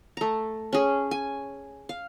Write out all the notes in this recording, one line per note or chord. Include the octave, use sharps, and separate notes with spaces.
A3 A#5
C#4 G#4
G#5
F5